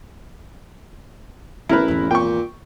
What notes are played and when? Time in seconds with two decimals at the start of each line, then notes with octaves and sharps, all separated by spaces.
1.69 A1 B3 D4 E4 A#4 B4
1.88 G#1 E2
2.11 A#2 G5 C#6